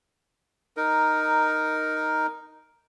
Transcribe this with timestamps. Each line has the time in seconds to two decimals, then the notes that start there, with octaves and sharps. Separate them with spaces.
0.77 D#4 A#4